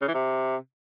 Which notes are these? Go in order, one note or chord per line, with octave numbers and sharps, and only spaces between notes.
C#3
E3
C3